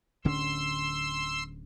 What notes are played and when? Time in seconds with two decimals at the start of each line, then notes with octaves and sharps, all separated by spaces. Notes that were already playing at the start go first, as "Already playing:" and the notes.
0.25 D1 D3 C#4 C6 E6